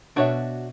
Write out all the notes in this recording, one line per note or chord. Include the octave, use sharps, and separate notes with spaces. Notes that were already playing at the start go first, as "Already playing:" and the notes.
B2 D4 F#4 C#5 E5